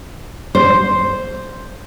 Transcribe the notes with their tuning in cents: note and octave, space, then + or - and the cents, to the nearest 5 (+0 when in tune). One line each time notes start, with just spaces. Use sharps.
C5 +0